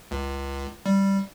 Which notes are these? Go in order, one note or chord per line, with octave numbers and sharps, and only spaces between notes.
C#2
G3